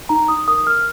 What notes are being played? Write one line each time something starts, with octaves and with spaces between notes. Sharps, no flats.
D#4 A#5
D#4 D#6
A#4 D#6
A#4 F6